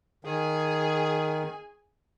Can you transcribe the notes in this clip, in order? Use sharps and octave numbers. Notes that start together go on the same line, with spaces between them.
D#3 G#4 G#5